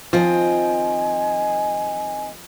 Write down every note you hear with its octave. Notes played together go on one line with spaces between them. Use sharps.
D#3 F3 C4 D#5 G#5